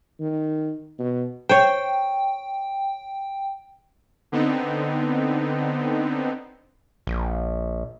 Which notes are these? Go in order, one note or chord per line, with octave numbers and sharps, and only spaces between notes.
D#3
B2
C5 C#5 G5
D3 B3 C4 D#4
A#1